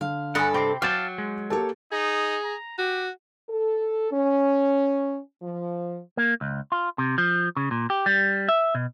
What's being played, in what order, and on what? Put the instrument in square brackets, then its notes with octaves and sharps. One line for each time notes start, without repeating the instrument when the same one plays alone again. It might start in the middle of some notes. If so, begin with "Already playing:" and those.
[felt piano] D3 [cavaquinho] F5
[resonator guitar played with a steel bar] G2 A4 [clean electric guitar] F#5 [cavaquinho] G#5 B5 D#6
[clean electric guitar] C3 C4 [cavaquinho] G5 [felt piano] B5 D6 C7
[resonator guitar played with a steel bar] F#3 [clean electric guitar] F5 A5 [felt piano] D6 G6 A6
[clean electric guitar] G#3
[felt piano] A#3 G4 A4 [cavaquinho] C#5 A5
[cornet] D#4 [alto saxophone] G#4
[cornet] A#5
[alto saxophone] F#4 [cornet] G4
[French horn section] A4
C#4
F3
[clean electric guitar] A#3
C#2
F4
C3
F3
C#3
A#2
G4
G3
E5
B2